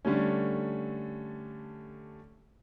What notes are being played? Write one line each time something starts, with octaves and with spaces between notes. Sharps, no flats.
D3 G3 A3 C#4